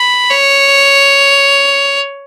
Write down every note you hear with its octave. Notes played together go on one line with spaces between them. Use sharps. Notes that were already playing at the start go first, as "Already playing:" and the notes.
Already playing: B5
C#5